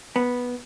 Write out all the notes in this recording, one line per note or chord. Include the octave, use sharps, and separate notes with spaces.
B3